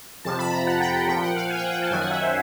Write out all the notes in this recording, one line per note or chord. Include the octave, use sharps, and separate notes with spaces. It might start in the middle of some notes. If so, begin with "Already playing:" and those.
F2 C3 F3 A5
B5
A#5
F#5
G5
F#5
A#2 F3 G5
F#5
F5
G#5
G5
F#5
G5
A5
F#2 D#3 F#3 G#5
F#5
E5
C5